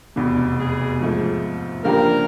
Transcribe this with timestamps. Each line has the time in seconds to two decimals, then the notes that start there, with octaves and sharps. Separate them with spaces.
0.16 F1 E2 B2
0.59 G#4
1.00 G#2 F3 A3
1.84 C#3 F3 A#3 D4 G4 A#4